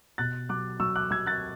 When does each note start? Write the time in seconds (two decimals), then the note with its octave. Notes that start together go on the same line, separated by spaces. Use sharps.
0.18 B2 F#6 A6
0.49 F#3 D6 F#6
0.80 F#3 C#6 E6
0.96 D6 F#6
1.11 F#3 E6 G#6
1.26 F#6 A6